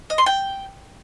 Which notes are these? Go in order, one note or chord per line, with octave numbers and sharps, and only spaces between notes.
D#5
C6
G5